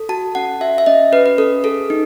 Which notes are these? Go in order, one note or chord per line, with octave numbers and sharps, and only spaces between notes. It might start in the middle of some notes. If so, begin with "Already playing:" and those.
Already playing: A4
F#4 A5
C#4 F#5
F#4 E5
E5
C#4 D#5
C#4 B4
B4
C#4 A4
G#4 A4
D#4